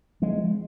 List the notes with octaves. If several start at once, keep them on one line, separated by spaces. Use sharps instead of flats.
F3 G#3